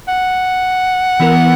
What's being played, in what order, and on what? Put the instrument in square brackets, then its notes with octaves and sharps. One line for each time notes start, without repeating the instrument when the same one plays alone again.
[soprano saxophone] F#5
[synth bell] E3 B3 E4 A#4